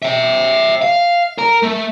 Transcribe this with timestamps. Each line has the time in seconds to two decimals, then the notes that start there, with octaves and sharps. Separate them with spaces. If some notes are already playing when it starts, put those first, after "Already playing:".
0.03 E5 G5
0.82 F5
1.38 A#4 A#5
1.63 A3